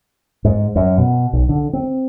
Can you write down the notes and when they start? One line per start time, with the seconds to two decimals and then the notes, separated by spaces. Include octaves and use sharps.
0.45 G#2
0.76 F#2
0.98 B2
1.33 B1
1.49 D3
1.73 C4